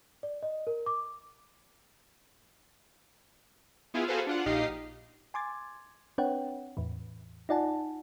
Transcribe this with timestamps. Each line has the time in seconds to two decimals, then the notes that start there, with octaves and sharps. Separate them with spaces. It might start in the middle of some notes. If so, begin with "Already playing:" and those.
0.23 D5
0.43 D#5
0.67 A#4
0.86 D6
3.94 B3 E4 F4 G#4 F5
4.08 F#4 G#4 A4 B4 C5 F5
4.27 D4 F4 F#5
4.46 A#1 D#4 G4 D#5 F5 C7
5.34 G#5 C6 D6 G#6 A6
6.18 C4 D4 B4 C#5 F#5 G5
6.77 E2 A2 E3
7.49 D#4 F4 D5 F#5 G#5 A5